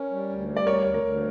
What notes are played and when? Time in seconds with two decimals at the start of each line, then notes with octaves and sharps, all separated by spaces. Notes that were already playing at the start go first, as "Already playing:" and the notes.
Already playing: C#4 A#4 C#5
0.11 G3
0.29 D2
0.48 G3
0.57 D5
0.66 D2 A#4 C#5
0.85 D2
0.94 A#4
1.03 D2